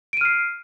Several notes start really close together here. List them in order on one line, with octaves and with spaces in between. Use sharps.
D7 D#7 F6 C7